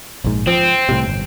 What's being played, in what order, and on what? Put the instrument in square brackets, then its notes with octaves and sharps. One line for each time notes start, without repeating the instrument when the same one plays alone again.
[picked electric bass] A#1 G#2
[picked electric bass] F3 [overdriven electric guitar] C4
[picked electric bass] C2 A2 C3
G1